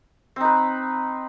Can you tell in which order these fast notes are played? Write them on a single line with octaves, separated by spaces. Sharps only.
C4 D#4 B4